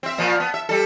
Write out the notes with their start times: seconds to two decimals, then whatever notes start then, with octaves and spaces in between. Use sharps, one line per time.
0.03 C4 E5
0.18 A#2 F3
0.40 B3
0.54 E5
0.69 G3 A4